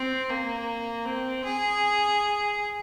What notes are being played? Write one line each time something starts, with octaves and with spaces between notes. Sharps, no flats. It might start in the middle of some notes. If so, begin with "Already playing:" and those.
Already playing: C4
A#3
C4
G#4